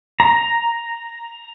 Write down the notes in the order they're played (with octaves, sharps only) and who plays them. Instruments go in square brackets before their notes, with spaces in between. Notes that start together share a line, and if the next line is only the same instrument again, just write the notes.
[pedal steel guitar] A#5